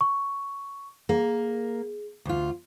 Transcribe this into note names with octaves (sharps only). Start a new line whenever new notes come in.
C#6
A#3 G#4
D2 F4